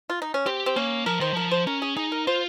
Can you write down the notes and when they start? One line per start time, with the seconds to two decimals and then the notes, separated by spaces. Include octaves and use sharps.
0.10 F4
0.22 D#4
0.34 C#4
0.46 C4 G4
0.66 C4
0.76 A#3 C#4
1.06 F3 A#4
1.20 D#3 C5
1.33 F3 A#4
1.51 C5
1.67 C#4 A#4
1.82 G#4
1.97 D#4 G#4
2.12 A#4
2.27 F4 C5